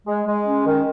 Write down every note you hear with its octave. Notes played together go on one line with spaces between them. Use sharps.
G#3
G#3
C#4
D#3